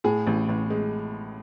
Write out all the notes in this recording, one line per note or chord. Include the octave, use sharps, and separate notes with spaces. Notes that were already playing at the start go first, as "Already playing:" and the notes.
A2 G#4
A1
A1
G#3